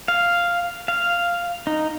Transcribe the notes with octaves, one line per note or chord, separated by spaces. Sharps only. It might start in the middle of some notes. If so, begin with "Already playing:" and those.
F5
F5
D#4